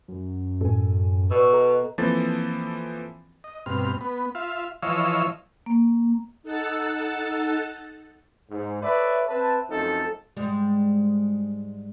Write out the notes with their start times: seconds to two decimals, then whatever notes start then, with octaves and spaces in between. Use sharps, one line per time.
0.08 F#2
0.61 A2 A4 G#5
1.31 B2 D5 C#6 E6
1.53 A4 D#5 A#5
1.98 E3 F3 A#3 C4 A4 A6
3.44 D#5
3.66 G2 B2 C4 F6
4.01 B3
4.35 F4 E5 F5
4.83 E3 F3 C#5 D#5 F5 E6
5.66 A#3
6.43 D#4 A4 F#5 E6 A6
8.50 G#2
8.82 A4 B4 C#5 D5 E5
9.29 C4 B4 E5 A5
9.69 F#2 F3 A3 C4 D#4 A4
10.37 G#2 G3 G#3